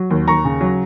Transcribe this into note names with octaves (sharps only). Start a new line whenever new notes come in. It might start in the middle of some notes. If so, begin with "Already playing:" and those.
Already playing: F#3
D#2
D#2 A#5 C#6
C#3
F#3